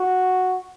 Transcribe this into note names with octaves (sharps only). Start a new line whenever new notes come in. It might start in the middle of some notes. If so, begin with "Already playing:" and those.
Already playing: F#4